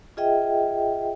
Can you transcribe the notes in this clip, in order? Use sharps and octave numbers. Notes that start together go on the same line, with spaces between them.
F4 G#4 D#5 E5 G5